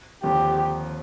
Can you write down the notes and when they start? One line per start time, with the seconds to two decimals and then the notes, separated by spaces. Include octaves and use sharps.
0.23 D#2 D3 F3 C4 G4